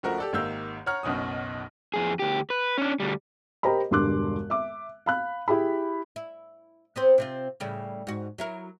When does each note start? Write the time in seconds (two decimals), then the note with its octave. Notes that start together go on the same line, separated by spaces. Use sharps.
0.03 C#2 F3 A3 F#4 A#4
0.18 G4 A4 D5
0.33 G#1 D#3 A#3 G4 E6 G6
0.86 C#5 F#5 A#5 F6
1.03 F#1 B1 B2 C#4 D#6
1.94 F2 G#4
2.19 D2 G4
2.50 B4
2.78 C#4 D4
3.00 D2 G3
3.63 G4 A#4 C5 D#5 A#5 B5
3.91 E1 G2 D3 C6 D6 F#6
4.50 E5 D6
5.06 F5 B5 F#6
5.48 E4 G4 G#4 B5
6.16 E4
6.96 B3 C4 C5
7.18 C3 C4 F4
7.60 A2 C#3 G3
8.07 G#2 F#4
8.38 F#3 E4 A#4